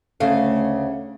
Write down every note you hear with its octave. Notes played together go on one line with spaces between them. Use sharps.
D2 C#3 A3 F5